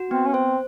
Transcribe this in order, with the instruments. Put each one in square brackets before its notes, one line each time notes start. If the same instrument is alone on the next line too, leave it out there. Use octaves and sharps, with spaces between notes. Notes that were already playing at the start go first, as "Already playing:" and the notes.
Already playing: [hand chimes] F#4
[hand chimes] B3 [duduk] C4
[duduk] C#4
[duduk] C4 [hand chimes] C5